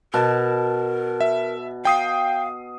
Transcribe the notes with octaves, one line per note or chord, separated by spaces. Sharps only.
B2 A#4 A5
E5
F5 G5 D#6 C7